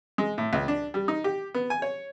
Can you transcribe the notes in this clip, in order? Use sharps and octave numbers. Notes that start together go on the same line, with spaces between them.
G#3
A2
C#2
D4
G3
D#4
G4
B3
G#5
C#5